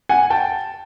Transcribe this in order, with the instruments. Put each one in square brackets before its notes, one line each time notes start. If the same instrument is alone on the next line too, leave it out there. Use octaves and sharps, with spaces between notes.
[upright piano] F#5 G#5
G5 A5